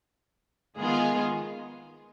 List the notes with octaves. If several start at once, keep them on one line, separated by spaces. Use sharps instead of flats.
D#3 G#3 B3 F4 G#4